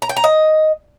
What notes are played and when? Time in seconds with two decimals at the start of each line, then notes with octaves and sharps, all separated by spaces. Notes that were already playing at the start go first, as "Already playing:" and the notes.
0.02 A#5
0.09 G5
0.17 A#5
0.24 D#5